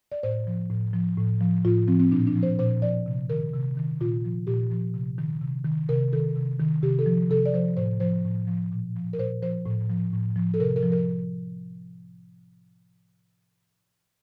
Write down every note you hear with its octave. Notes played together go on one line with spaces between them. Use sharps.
D5
A2 C5
F3
A2
F3
A2
F3
A2 F4
F3 C4
C4
A#2 D4
D4
F3
C5
A#2 C5
F3 D5
C3
D#3 A#4
C3
D#3
A#2 F4
F3
A#2 G4
F3
C3
D#3
C3
D#3
C3 A#4
D#3 A4
C3
D#3
C3 G4
A4
F3
C3 A4
D5
F3 C5
A2 C5
F3 C5
A2
F3
A#2
F3
A#4
A#2 C5
F3 C5
A2
F3
A2
F3
A4
C3 A#4
A#4
F3
A#4